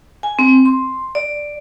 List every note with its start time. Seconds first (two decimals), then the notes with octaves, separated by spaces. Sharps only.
0.23 G#5
0.39 C4
0.65 C6
1.15 D5